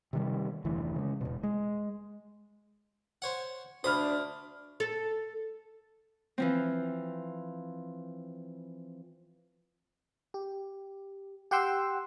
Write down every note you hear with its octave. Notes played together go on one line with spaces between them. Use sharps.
C3 D#3 G3
F1 D2 E3
C#3 G#3
E1 E2 B2
G#3
C5 C#5 F#5
D2 D4 C5 B5 D#6 F6
A4
E3 F3 C4
G4
G4 F#5 G5 C6 E6